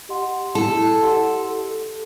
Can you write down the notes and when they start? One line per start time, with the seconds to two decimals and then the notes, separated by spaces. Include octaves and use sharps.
0.09 G4 D#5 F#5 C6
0.55 E4 A4
1.02 G4 D#5 F#5 C6
1.49 A4